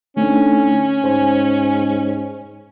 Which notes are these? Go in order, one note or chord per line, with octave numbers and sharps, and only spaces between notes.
D3 A3 C4 C#4 D#4
G#2 C5 G#5